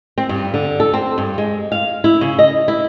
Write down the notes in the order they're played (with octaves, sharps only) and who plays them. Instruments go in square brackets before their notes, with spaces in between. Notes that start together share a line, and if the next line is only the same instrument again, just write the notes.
[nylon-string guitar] C4
G2
D3
A4
C4
G2
G#3
F5
E4
C#3
D#5
E4